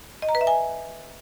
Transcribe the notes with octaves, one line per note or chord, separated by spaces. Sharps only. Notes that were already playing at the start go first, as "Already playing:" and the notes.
D#5
A#5
B4
E5
G#5